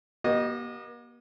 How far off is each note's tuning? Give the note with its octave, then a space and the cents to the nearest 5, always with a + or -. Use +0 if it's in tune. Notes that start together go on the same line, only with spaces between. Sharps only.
A#3 +45 G4 -30 D#5 -10